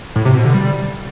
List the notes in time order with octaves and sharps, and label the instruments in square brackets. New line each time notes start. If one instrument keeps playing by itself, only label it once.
[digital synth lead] A2
C3
B2
D3
G3